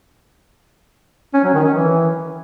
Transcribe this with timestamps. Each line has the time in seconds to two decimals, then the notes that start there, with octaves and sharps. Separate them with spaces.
1.34 C#4
1.44 F#3
1.54 D#3
1.64 C#4
1.74 E3